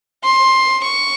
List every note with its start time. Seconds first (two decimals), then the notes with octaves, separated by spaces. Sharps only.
0.24 C6
0.84 C#6